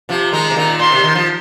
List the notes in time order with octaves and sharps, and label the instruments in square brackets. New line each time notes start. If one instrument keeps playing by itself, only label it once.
[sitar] C3 F3
[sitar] D#3 G#3 [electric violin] A#5
[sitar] C3
A#2 D#3
[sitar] A#2 [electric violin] C6
[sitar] C3
D#3
F3